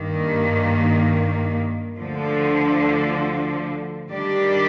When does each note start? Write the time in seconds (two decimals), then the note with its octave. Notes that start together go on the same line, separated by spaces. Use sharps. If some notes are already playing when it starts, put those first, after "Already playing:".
Already playing: G2 D#3 A#3
1.98 D2 D3 F3
4.11 D#3 G3 D4 G4 D5